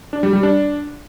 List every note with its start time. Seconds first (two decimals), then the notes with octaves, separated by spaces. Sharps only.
0.13 D4
0.23 G3
0.33 G3
0.43 D4